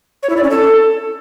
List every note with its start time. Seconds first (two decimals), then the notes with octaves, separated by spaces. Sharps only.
0.23 C#5
0.30 E4
0.37 D5
0.43 C#4
0.50 A4